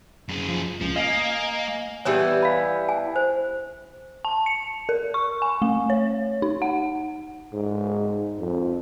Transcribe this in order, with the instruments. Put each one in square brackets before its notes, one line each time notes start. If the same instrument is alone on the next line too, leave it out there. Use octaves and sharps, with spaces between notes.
[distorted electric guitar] F#2 G#4
[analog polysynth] F3
[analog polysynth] C#2 [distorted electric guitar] F3
[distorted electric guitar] A#3 [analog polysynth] D#5 F5 G#5
[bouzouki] E3 G3 B3 [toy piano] G4 C#5
[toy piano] F5 B5
G#5
C5
[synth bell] A5
C#7
A#4
C#6
G#5
A3
C#5
D#4
F#5
[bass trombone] G#2
F2